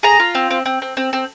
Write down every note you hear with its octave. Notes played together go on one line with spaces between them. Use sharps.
G#4 A#5
F4
C4
C4
C4
C4
C4
C4